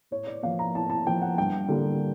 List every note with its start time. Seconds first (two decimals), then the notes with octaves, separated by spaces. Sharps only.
0.11 A2 C#5
0.27 D5
0.43 F3 A#3 F5
0.59 A#5
0.75 A2 A5
0.90 A5
1.06 F3 A#3 G5
1.22 F#5
1.38 G2 G5
1.68 D3 G3 A#3